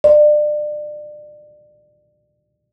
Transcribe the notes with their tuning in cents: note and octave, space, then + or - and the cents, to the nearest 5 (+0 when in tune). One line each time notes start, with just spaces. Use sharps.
D5 +30